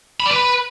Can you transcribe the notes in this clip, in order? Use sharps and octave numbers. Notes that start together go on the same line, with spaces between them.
B5
D5
B4